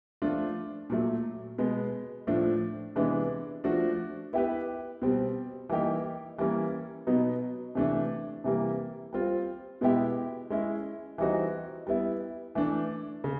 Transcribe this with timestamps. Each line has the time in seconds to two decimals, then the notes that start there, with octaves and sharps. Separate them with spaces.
0.22 F3 A3 D4 F4
0.90 A#2 F#3 A3
1.58 B2 G#3 B3
2.27 A2 F3 A3 D4
2.96 C3 E3 G#3 B3 D4
3.64 F3 A3 D4 F#4
4.33 B3 E4 G4 B4
5.02 B2 G3 C4
5.69 E3 G3 A#3 D#4 G4
6.38 E3 G3 A#3 C#4
7.07 B2 F#3 B3 D#4
7.75 C3 E3 A3 D4
8.44 C3 E3 G3 A#3
9.13 G3 C4 F4
9.81 B2 G#3 B3 E4 G4
10.50 G#3 C#4 E4
11.18 E3 G3 C4 D#4 F#4
11.87 G3 B3 E4
12.55 E3 A3 D4
13.24 C#3